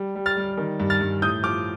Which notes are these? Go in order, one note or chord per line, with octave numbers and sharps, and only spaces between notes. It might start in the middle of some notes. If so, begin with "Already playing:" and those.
Already playing: G3
G3
F6 A6
G3
D#3
G2
F6 A6
G2
A2 D#6 G6
F3 D6 F6